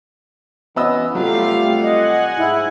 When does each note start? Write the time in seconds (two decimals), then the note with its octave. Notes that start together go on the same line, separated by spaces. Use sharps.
0.76 E3 B3 C#4 D#5 E6
1.15 C3 F#3 G3 A3 F4 G4 F5
1.83 D#5 F#5 G#5
2.38 G#2 E4